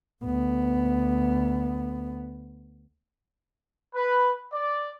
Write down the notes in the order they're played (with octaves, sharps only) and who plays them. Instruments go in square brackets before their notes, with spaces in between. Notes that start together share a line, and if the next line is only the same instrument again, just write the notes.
[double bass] D2 B3
[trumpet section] B4
D5